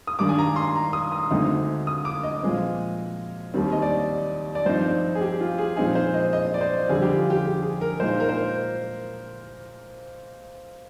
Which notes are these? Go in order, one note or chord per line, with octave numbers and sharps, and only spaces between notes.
D#6
G2 D#3 G#3 D4 D6
G#5
A#5
C6
A#5
D#6
D#6
D2 D3 G#3 C4 D#4
D#6
D6
D#5
A#2 F3 G#3 C4
D#2 D#3 G3 C4
D#5
D5
D5
G2 F3 C4 D#4 C5
G#4
G4
F4
G#4
A#2 F3 G#3 C4 D#4 G#4
C5
D#5
D#5
D5
C5
F2 D3 G3 G#4
G4
F4
G4
G#4
G#4
A#4
A#2 G#3 D#4 C5
A#4
C5